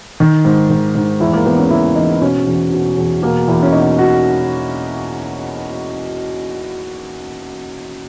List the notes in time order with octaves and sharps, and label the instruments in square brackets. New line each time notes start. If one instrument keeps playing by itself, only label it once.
[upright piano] D#3
G#2
D#3
G#2
E2 E4
A#3
E2 B3
C#4
C#3 E4
E3 D#4
B2 C#4
E2
B2
E2
B2 A#3
E2 E4
C#4
B2 D#4
F#4